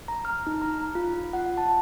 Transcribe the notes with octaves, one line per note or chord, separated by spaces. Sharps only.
A#5
F6
D#4
A#5
F4
F#5
A5